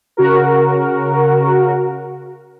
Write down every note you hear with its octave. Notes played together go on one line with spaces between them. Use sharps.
C#3 F#4 A#4